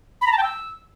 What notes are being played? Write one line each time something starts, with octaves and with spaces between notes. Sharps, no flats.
B5
A#5
A5
G5
E6